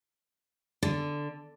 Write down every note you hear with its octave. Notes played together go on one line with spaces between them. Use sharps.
D3